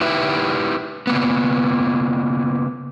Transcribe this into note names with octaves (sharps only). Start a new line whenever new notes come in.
D#4 E4 G4 B4 E5
C#3 A#3 B3